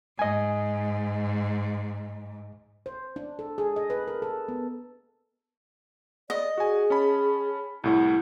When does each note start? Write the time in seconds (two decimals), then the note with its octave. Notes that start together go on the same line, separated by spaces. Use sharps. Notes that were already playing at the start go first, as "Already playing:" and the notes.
0.19 G#2 D#5 G#5
2.86 C5
3.16 D4
3.39 A4
3.58 G#4
3.76 D#5
3.90 B4
4.08 A#4
4.22 A4
4.49 B3
6.30 D5 D#5
6.58 F#4 G#4 G#5
6.90 C#4 A5 B5
7.84 C2 A2 E4 F#5